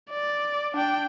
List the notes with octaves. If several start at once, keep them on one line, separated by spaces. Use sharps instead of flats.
D5
D4 G5